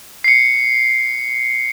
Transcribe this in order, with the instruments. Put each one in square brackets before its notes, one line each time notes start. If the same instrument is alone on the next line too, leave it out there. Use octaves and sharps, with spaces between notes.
[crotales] C7 C#7